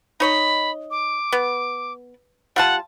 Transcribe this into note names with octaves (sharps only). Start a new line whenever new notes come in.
D#4 C#5 D#5 B5
D6
B3
G3 F4 F#5 A5